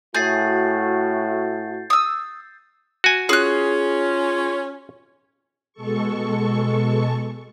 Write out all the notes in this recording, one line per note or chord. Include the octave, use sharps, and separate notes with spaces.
A2 A3 F#4 G#4 G6 A6 C7
D#6 E6
F#4 G#5
C#4 F4 G#4 F#6
B2 G#3 A4 C#6